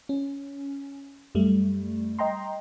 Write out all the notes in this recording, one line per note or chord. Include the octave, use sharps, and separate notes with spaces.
C#4
F#2 G3 A3
D#5 G5 A#5 C6